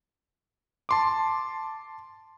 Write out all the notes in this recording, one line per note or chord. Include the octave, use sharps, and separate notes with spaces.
A5 C6 D6